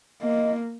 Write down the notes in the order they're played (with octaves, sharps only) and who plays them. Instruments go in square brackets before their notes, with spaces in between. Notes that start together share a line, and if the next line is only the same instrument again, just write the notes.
[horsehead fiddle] A#3 [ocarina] D#5